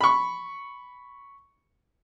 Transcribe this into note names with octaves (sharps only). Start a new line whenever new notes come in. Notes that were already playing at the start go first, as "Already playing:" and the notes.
B5 C#6